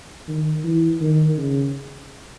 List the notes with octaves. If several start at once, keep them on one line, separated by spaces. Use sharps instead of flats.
D#3
E3
D#3
C#3